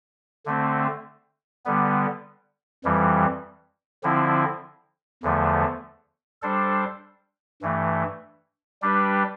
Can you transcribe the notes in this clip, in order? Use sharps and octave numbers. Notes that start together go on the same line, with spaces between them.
D3 A3 C4
D3 G3 B3
F2 E3 G3
D3 F3 C4 E4
E2 D3 F3 A3
G3 D4 A4 C5
G2 E3 A3
G3 D4 G4 B4